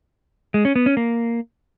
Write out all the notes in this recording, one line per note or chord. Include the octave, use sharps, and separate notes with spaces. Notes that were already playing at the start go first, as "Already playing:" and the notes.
G#3
C#4
B3
C#4
A#3